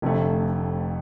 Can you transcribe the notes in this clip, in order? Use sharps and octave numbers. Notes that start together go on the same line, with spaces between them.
F1 F2 D3 A3